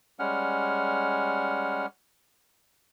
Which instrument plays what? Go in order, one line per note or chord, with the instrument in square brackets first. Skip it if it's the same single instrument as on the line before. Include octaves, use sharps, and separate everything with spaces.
[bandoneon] G3 G#3 C#4 F#5 F6